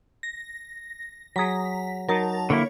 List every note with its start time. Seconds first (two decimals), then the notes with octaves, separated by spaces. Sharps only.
0.23 A#6
1.36 F#3 G#4 A#5 B6
2.09 F#3 D#4 A#4 A5
2.50 D3 A#3 E4 C#5